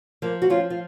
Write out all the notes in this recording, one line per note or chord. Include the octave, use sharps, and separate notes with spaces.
F3 A#3
F#4
F3 C#4 F4
F4